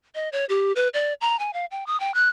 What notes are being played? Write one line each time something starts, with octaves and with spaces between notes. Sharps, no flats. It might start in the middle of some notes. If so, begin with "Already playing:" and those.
D#5
C#5
G4
B4
D5
A#5
G#5
F5
G5
D#6
G5
F#6